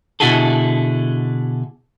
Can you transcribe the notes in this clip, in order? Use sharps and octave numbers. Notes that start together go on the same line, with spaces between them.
B2 D3 E4 F#4 G#4 A4